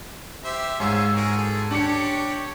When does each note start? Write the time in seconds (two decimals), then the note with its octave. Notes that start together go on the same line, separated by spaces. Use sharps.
0.45 G4 C5 E5
0.80 G#2 C#4 F4 G#4 E6
1.16 F#4 G#4 A#4
1.37 G#4 A4
1.71 D4 G4 C#5 C#7